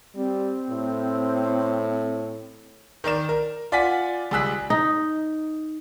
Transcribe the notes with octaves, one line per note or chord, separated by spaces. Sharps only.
G3 C4
A2
D#3 A#4 D5 E7
A#4
F4 D5 F#5 G#5 B6
C#2 G3 G#4 E6 F#6 B6
D#4